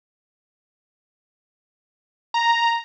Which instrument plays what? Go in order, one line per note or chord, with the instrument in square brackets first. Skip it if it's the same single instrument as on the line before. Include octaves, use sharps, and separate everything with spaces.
[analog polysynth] A#5